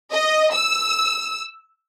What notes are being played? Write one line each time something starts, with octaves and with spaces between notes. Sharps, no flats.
D#5
E6